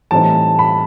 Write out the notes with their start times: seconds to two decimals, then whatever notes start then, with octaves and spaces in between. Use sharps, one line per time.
0.11 A2 E3 G3 C4 D#4 A5
0.59 B5